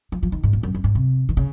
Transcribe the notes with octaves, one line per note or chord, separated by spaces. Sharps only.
F3
F3
D#3
G#2
A#2
F#2
F#2
G#2
C3
D#3
C#3